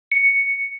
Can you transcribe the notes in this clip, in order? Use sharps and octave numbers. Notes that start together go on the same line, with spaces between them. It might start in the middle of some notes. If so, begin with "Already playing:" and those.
C#7